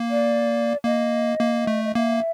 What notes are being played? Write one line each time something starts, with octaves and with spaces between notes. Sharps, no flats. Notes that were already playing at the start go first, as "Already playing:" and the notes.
Already playing: A#3
D5
A#3 D#5
A#3
A3
D#5
A#3 E5